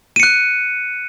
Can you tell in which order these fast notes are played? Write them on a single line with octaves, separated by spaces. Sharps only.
D#7 C#7 F#6